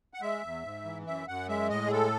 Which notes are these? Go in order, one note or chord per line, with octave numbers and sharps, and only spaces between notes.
F#5
G#3 E5
E2
G#2
E3
F#2 E5
F#2 F#5
G#3 E5
A2 D#5
G#4
G#3 A4